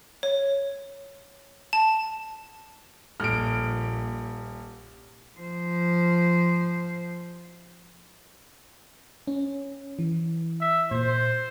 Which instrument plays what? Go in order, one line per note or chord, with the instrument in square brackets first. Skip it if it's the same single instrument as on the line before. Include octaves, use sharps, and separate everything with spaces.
[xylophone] C#5
A5
[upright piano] D#1 [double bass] A#1 A#2 [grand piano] F6 D7
[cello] F3 C5
[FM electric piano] C#4
E3
[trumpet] E5
[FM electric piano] A#2 [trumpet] C5